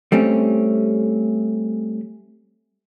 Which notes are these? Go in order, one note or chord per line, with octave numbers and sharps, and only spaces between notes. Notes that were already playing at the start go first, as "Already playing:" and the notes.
G3 A3 C4 C#4